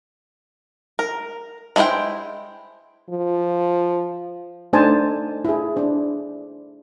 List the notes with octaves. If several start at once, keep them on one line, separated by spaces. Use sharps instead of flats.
A#4
G#3 A#3 E4 C5 G5
F3
A3 D4 D#4 C5 G#5 A5
E4 G#4
D4 C5